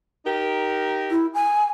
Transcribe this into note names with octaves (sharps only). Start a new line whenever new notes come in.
D#4 G4 A#4
E4
G#5